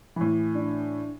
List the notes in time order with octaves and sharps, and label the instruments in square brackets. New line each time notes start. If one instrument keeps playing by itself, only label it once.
[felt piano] A2 E3
[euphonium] D4